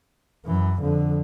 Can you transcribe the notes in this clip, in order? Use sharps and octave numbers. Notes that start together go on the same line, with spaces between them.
F#2 E3
F2 D3